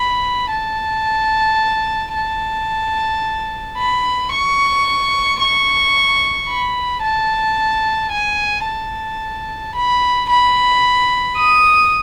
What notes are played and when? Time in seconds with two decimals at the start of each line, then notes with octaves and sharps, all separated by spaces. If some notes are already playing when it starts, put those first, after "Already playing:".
Already playing: B5
0.52 A5
2.15 A5
3.78 B5
4.32 C#6
5.40 C#6
6.48 B5
7.03 A5
8.12 G#5
8.66 A5
9.75 B5
10.29 B5
11.38 D#6